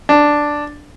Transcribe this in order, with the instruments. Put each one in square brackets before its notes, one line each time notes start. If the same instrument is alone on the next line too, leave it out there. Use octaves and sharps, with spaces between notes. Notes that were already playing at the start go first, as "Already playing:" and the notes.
[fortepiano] D4